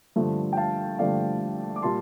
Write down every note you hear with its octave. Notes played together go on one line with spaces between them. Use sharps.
G2 D3 F3 A3
G5
F5 A5
G2 D3 F3 A3 D5 F5
D6
A#2 G3 A5 C6